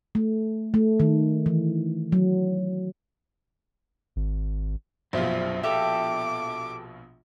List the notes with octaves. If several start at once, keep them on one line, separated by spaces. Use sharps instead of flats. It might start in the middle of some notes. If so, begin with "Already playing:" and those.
A3
A3
D#3
E3
F#3
G#1
A#1 F#2 B2 F4 C5 E5
G4 A4 E5 D6